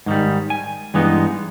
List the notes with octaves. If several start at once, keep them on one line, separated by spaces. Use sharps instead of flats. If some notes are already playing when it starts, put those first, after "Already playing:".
G#2 D#3 G3
G#5
G2 E3 G#3 B3 D#4